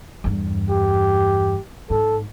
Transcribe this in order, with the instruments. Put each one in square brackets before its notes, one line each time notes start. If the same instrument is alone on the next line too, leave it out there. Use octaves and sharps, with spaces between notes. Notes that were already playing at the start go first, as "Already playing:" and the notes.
[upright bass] E2 G2
[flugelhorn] G4
[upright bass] G#2 [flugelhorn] A4